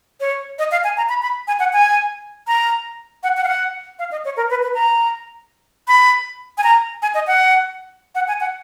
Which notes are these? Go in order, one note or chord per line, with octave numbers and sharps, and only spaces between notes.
C#5
D#5
F5
G#5
A#5
B5
B5
G#5
F#5
G#5
A#5
F#5
F#5
F5
F#5
F5
D#5
C#5
A#4
B4
B4
A#5
B5
G#5
A#5
G#5
D#5
F#5
F#5
G#5
F#5